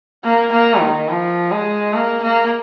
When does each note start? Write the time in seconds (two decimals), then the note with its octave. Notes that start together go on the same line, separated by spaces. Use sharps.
0.24 A#3
0.52 A#3
0.80 D#3
1.08 F3
1.51 G#3
1.94 A#3
2.23 A#3